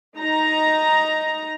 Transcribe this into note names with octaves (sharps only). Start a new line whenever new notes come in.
D#4 A#5